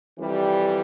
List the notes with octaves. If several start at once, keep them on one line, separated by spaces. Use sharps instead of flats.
F2 C3 E3 G3